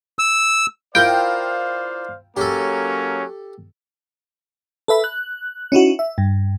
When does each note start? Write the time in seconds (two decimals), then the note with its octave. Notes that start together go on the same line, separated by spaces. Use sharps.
0.19 E6
0.95 E4 F4 A#4 C5 D5 F5 G5
2.37 F#3 A#3 C#4 G4 A4
4.88 A4 B4 E5 B5
5.04 F#6
5.72 C#4 D#4 E4 F#4
5.99 E5
6.18 G2